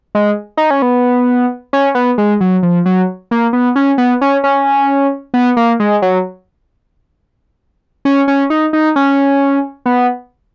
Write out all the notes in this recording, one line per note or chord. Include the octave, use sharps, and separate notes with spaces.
G#3
D#4
C#4
B3
C#4
B3
G#3
F#3
F3
F#3
A#3
B3
C#4
B3
C#4
C#4
B3
A#3
G#3
F#3
C#4
C#4
D#4
D#4
C#4
B3